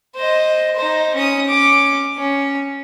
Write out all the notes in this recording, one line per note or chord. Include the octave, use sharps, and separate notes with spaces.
C5 D#5
D#4 C5
C#4 D#6
C#4 D6
C#4